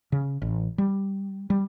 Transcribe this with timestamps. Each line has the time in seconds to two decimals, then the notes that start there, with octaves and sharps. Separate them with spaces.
0.12 C#3
0.42 A1
0.78 G3
1.50 G3